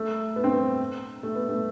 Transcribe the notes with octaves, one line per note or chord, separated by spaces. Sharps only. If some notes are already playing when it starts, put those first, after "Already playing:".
Already playing: A3
B3
C4
B3
A3
B3
A3